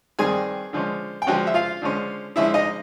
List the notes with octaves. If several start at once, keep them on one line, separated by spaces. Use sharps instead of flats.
G2 D#3 G3 C4 G#4 G#5
D3 F3 G#3 C#4
G5
D3 F3 G#3 C#4 F#4 F#5
E5
F4 F5
D3 F3 G#3 C#4
D3 F3 G#3 C#4 E4 E5
D#4 D#5